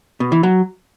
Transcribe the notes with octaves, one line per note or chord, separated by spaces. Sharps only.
B2
E3
F#3